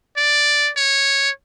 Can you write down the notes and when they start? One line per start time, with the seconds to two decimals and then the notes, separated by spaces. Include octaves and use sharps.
0.17 D5
0.77 C#5